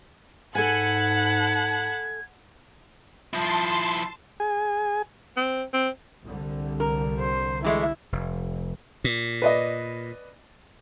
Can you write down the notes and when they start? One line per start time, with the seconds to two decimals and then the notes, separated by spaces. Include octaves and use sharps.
0.55 G#2 A4 F#5 G#5 A5 B5 G#6
3.33 F3 E4 A5 C6
4.40 G#4 G#5
5.37 C4
5.74 C4
6.24 C2 D3 G3
6.80 A#4
7.19 C5
7.64 E3 G#3 A3 E4
8.12 F1
9.04 A#2
9.42 B4 D5 D#5